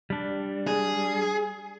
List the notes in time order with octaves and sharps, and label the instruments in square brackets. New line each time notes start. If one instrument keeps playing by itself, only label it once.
[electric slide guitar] G3 D4
[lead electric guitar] G#4